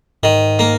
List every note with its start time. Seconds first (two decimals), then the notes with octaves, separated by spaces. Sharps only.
0.23 G#2 D#3
0.59 A#3